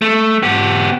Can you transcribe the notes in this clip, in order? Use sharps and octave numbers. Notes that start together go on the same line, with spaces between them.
A3
B3 G4